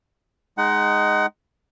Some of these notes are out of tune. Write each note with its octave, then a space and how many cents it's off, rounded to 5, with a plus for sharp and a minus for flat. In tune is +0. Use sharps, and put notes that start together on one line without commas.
G#3 +0 D#4 +0 F#5 +25